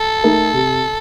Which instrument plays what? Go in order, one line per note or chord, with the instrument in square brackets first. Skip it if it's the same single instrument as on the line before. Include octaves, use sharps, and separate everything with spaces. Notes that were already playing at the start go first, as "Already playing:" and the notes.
Already playing: [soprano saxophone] A4
[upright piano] A3 D#4 A#4
C3